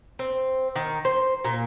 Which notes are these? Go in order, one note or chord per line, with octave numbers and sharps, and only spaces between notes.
C4
D#3
C5
A#2